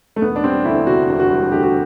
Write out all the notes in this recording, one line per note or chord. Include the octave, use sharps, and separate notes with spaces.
A3
E1 B3
D4
G3 C4
D2 E4
C3 F#4
E1
F#4
G3
D2 G4
F#4